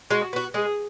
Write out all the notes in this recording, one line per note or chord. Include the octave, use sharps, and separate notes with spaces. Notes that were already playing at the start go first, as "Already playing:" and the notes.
G#3 F#4
B3 F#4
G#3 G#4